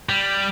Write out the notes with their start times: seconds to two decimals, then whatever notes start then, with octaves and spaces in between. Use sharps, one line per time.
0.09 G3